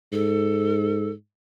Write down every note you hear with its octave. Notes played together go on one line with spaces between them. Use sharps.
G#2 A4